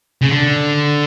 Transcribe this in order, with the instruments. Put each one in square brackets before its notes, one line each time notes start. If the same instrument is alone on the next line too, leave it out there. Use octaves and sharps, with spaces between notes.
[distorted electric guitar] C#3
D3